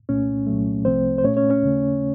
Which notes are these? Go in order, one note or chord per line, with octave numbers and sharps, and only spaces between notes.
C2 A#2 A3 C#4
C2 A#2 F#3 A3
C2 C3 F3 A3 C4 C5
C5
A#2 A3 C#4 C#5
C#4 C#5
C#4 C#5
D#2 C#3 A3